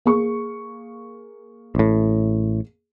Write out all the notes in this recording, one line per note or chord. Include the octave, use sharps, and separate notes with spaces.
A#3 G#4 C#6
A1 A2